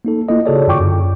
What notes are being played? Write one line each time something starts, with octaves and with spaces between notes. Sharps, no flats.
A#3 D#4 A4
A#3 E4 F4 A4 D#5
C#3 F#4 G#4 A4 C#5 D5
F#2 D3 F4 G5 C#6 D6
F#2